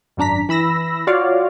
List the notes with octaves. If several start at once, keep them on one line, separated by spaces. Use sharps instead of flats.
G#1 F#2 D4 A#5 B6
E3 B5 E6 A#6
F4 F#4 C#5 D5 F5